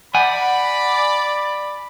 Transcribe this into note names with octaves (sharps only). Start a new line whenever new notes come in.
D5 F#5 G#5 B5